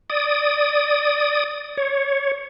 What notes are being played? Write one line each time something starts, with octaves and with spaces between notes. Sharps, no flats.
D5 D#6
C#5